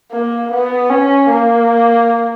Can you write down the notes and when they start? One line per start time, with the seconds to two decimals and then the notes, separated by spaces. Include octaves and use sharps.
0.12 A#3
0.51 B3
0.90 C#4
1.30 A#3